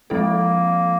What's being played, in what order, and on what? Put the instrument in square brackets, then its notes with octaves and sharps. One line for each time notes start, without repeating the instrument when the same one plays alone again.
[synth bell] F3 G#3 C4 E4 A4 [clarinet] A#3